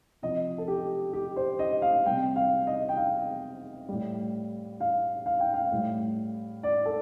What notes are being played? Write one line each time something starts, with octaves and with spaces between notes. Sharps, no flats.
C3 F3 D#5
A4
G4
G4
C5
D#5
F5
C3 G3 G5
F5
D#5
G5
F5
A2 G3
F5
F5
G5
F5
A2 G3
D5
A4